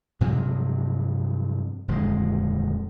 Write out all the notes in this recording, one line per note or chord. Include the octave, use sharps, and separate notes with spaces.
G2 C3 F3 F#3
D#1 F2 D3 G#3